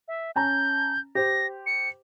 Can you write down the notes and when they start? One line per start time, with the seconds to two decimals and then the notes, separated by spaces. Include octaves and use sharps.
0.08 E5
0.36 C#4 A5 A#5 G6
1.15 G4 C5 A#6
1.66 C#7